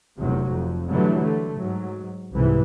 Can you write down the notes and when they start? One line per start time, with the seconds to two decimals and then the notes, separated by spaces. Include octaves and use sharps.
0.18 F1 E2 C3 F#3
0.50 F2
0.90 D3 E3 F#3 G3 A3
1.22 D3 A3
1.55 G#2 F#3
2.31 C2 G#2 C3 E3